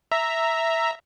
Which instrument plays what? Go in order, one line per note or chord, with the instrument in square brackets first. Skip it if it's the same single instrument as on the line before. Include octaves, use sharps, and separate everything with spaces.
[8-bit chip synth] E5 A#5